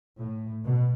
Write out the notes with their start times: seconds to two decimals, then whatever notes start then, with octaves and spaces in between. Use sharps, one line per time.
0.19 A2
0.64 B2